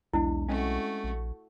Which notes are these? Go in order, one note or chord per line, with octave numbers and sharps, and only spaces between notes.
B1 E2 G#3 D4 E4
G#3 A3 C4 C#4 F#4
A#1